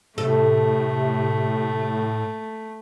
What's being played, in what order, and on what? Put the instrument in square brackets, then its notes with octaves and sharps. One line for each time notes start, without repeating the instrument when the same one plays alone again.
[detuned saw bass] A2 [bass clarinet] C3 [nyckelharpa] A3 [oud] A4